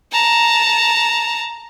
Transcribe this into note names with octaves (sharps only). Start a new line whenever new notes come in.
A5 A#5